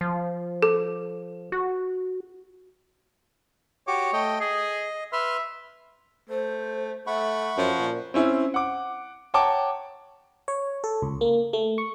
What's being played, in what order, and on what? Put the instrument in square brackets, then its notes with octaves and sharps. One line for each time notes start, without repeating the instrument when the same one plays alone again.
[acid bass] F3
[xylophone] A4
[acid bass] F#4
[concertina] F#4 G4 D6 [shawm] C#5
[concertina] A3 D#5 G5
[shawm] G#4 [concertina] D#5
[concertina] B4 C6 F6 [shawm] E5
[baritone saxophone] A3 [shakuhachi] C5
[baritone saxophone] A3 [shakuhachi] E5 [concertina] F#5 B5 C#6
[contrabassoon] F#2 [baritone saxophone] F3
[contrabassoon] A#2
[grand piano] C4 C#4 E4
F#5 D6
C#5 F#5 G5 A5 A#5 D6
[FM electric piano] C#5
A4
C#2
A#3
A3
C#6